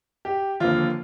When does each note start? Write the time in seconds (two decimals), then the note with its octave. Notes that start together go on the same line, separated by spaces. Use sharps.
0.25 G4
0.60 D#2 D3 F3 A#3 F4